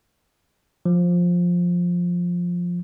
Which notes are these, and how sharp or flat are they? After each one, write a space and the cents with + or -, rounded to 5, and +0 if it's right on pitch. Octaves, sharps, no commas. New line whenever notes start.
F3 +10